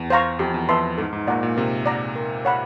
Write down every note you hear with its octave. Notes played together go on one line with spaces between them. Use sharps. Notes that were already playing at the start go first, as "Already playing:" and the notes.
Already playing: E2
C5 F5 A#5 C#6
F2 G4
E2
F2 B4 E5 A5 C6
G#2 A4
G#2
A#2 D5 F#5 A#5 C#6
A#2
C3 A#4
D5 F#5 A#5
A#4
C#5 F#5 B5